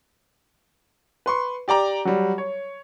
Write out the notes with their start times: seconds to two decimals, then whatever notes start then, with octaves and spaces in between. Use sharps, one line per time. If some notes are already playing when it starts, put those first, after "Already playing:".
1.26 B4 C6 C#6
1.68 G4 D5 G5 A#5
2.05 F#3 G3
2.38 C#5